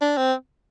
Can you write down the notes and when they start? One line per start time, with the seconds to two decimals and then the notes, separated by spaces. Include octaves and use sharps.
0.01 D4
0.17 C4